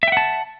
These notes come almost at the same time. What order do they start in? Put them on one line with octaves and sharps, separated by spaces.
E5 G5 F#5 A5